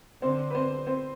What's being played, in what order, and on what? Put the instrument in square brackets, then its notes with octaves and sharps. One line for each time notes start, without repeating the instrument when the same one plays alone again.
[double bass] D3 [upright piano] C4 C5
[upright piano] B4
C4 C5
C4 C5